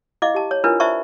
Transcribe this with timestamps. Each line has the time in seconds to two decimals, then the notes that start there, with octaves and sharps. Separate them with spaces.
0.22 E4 D#5 F5 D6
0.34 G4 A5
0.51 C#5
0.64 D4 E4 F4 A#4 B4
0.80 C5 D5 E5 A5 B5 C#6